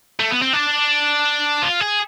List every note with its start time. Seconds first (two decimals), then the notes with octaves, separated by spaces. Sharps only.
0.19 A3
0.31 B3
0.42 C4
0.53 D4
1.62 F4
1.80 G#4